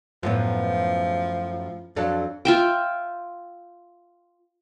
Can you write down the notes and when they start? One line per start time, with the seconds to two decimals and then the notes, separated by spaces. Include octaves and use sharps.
0.23 F#2 A2 F3 B3
1.96 F2 F#3 D4 A4
2.45 F4 E5 G5